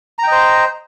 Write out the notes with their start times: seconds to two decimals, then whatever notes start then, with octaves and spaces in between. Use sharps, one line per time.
0.19 A#5
0.23 G5
0.27 D#5
0.32 C5